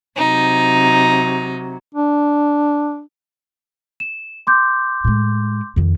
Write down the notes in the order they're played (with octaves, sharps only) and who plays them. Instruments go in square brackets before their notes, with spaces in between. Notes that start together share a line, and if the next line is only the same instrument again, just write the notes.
[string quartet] C3 F#3 [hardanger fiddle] D#4
[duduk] D4
[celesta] E7
C6 D6 G6
[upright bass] A2 G#3
F2 D#3